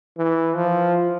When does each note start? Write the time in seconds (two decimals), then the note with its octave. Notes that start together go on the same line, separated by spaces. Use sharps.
0.18 E3
0.55 F3